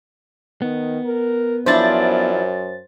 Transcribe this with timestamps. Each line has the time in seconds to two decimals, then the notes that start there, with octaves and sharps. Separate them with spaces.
0.62 D#3 B3
1.05 A#4
1.66 F#2 F3 D4 E4 C5 A6